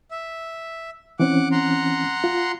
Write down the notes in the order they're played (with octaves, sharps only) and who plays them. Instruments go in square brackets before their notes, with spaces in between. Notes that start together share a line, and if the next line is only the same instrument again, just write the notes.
[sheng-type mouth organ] E5
[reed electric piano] E3 C4 C#4 [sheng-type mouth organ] F#5 D6
[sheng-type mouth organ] F#5 A#5 C6
[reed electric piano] F4